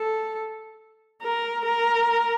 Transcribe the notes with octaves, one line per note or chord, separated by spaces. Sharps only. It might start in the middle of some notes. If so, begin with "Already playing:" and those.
Already playing: A4
A#4
A#4